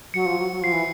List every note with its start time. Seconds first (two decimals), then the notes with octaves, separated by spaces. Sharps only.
0.14 F#3 C#7
0.26 F3
0.38 F#3
0.51 F#3
0.61 F3 C7
0.72 E3